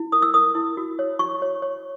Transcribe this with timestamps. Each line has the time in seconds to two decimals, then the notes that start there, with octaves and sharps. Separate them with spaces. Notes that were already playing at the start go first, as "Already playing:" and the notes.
Already playing: E4
0.12 A#4 D#6
0.22 E6
0.34 A#4 D#6
0.55 E4
0.77 F#4
0.99 C#5
1.19 F#4 C#6
1.42 C#5
1.62 C#5